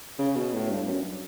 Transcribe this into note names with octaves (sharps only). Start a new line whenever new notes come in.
C#3
B2
A2
G2
F#2